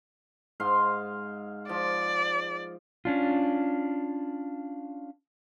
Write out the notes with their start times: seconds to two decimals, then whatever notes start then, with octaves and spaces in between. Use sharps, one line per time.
0.60 G#2 F5 C6
1.69 F3 D5
3.05 C#4 D4 F4